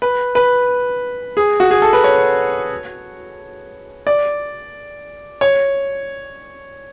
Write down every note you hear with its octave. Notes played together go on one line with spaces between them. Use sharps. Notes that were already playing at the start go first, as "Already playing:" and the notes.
B4
B4
G#4
F#4
G#4
A4
B4
C#5
D5
C#5